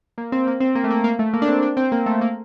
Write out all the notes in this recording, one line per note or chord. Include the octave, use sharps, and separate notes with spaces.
A#3
C4
A#3
C4
A#3
A3
A#3
A#3
A3
A#3
D4
C4
D4
C4
A#3
A3
A#3